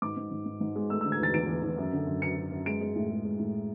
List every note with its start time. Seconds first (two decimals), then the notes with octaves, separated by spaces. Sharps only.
0.02 G#2 D6
0.17 G#2
0.31 G#2
0.46 G#2
0.61 G#2
0.76 G#3
0.90 A3 E6
1.01 E6
1.05 D3
1.12 G#6
1.20 E2 A6
1.34 E2 D7
1.48 E2
1.63 E2
1.78 F#2
1.93 D3
2.07 F#2
2.22 F#2 C#7
2.36 F#2
2.52 F#2
2.66 G#3 D7
2.81 G#3
2.96 A2
3.11 G#3
3.25 G#3
3.39 A2